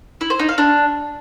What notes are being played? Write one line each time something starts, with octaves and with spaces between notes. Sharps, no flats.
E4
C5
D#4
F5
D4